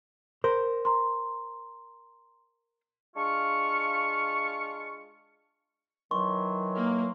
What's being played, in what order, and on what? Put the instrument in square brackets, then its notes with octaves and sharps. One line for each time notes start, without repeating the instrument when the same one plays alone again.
[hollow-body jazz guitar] A#4 C5
[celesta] A#5 C6
[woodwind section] G#3 D4 F4 F5 C#6
[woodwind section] D#3 E3 F#3 [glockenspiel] C6 C#6
[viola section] A#3